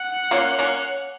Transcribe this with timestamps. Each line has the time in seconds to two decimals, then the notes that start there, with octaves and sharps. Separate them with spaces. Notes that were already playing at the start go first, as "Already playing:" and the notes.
Already playing: F#5
0.31 A#3 C#4
0.58 A#3 C#4